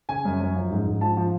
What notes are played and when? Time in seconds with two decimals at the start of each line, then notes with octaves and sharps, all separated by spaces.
0.09 C#3 G#5
0.25 F#2
0.40 F#2
0.56 F3
0.70 G#2
0.86 G#2
1.01 F3 A5
1.17 F3